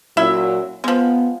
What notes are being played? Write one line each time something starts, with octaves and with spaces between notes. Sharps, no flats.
A#2 F#3 C#4 E4 E5
F3 G#3 B3